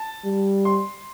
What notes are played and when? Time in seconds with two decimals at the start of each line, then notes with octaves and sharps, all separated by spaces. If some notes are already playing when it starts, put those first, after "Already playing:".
Already playing: A5
0.25 G3
0.65 C6